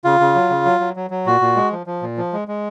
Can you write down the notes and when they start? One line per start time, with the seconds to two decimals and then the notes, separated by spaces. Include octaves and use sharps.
0.04 C#3 F4
0.20 C#3
0.35 F#3
0.50 C#3
0.66 F#3
0.80 F#3
0.96 F#3
1.10 F#3
1.26 A#2 F#4
1.41 A#2
1.56 G#3
1.72 F3
1.86 F3
2.02 A#2
2.17 F3
2.33 G#3
2.48 G#3